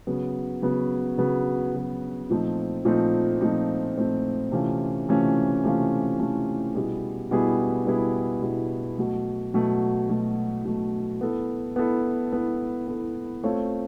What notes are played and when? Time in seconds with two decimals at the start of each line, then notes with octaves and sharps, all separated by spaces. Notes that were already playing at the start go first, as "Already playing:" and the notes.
0.07 C#3 F#3 B3
0.62 C#3 F#3 B3
1.18 C#3 F#3 B3
1.74 C#3 F#3 B3
2.30 A#2 F3 A3 C4 D#4
2.85 A#2 F3 A3 C4 D#4
3.41 A#2 F3 A3 C4 D#4
3.97 A#2 F3 A3 C4 D#4
4.52 C3 E3 A3 C#4 F4
5.08 C3 E3 A3 C#4 F4
5.64 C3 E3 A3 C#4 F4
6.19 C3 E3 A3 C#4 F4
6.75 B2 G3 B3 E4 G#4
7.31 B2 G3 B3 E4 G#4
7.86 B2 G3 B3 E4 G#4
8.42 B2 G3 B3 E4 G#4
8.98 B2 F#3 A3
9.54 B2 F#3 A3
10.09 B2 F#3 A3
10.65 B2 F#3 A3
11.21 B3 E4 A4
11.76 B3 E4 A4
12.32 B3 E4 A4
12.88 B3 E4 A4
13.43 A3 C4 F4 A4 C#5